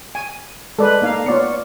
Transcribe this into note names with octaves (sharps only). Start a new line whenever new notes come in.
G#5
G#3 A4 B4 D5
A#3 D#4 F5
B3 F4 C#5 D5 C#7